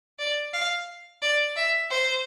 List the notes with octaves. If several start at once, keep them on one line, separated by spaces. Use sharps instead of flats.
D5
F5
D5
E5
C5